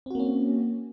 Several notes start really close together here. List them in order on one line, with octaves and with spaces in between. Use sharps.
C4 F#4 A#3 C#4